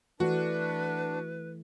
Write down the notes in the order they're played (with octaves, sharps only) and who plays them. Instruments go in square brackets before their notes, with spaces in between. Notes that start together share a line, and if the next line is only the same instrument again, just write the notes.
[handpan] E3 A3 [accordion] D4 [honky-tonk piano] F#4 [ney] B4